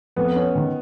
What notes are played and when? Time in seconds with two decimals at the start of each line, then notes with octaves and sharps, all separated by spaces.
0.16 F2 B3
0.36 C#4
0.55 D#3